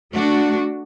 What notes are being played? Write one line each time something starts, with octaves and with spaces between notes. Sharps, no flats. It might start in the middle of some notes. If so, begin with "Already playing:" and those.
A3 D4 F#4